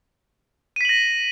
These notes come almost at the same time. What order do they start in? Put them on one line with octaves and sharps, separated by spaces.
D#7 B6 F#7 A#6